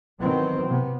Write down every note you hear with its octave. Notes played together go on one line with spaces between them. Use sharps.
D#3 E3 F#3 B3 C4
C3 B3